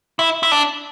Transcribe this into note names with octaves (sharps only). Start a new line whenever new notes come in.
E4
E4
D4